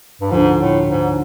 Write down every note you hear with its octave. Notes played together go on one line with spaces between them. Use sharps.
G2
D2 G#2 D3 F3
A2
G#2